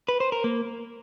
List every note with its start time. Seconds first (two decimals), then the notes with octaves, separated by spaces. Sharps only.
0.08 B4
0.20 C5
0.32 A#4
0.44 A#3